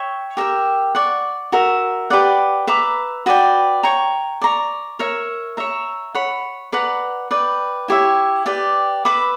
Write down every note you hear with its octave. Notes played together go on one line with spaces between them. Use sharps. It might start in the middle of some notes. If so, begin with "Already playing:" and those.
Already playing: C#5 E5 G5 C#6
G4 A#4 E5 G5
D5 F#5 C#6
F#4 A#4 E5
G4 B4 D5 F#5
B4 E5 A#5 D6
F#4 B4 D5 G5
C#5 G5 A#5 C#6
D5 A#5 C#6
A#4 C#5 E5
C#5 E5 A#5
C#5 F#5 B5
B4 D5 F#5 A#5
B4 D5 G5
E4 G4 C#5 E5
G4 B4 D5 G5
B4 E5 B5 D6